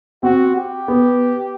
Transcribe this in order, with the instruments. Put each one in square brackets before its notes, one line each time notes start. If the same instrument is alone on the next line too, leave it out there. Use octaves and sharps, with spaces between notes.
[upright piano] C4 [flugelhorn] F#4
[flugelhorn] G4
[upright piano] B3